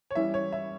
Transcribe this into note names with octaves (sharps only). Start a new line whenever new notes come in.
C#5
E3 G3 C#4 E4 E5
C#5
E5